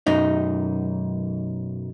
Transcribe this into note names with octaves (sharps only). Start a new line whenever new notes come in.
B1 F#2 D#4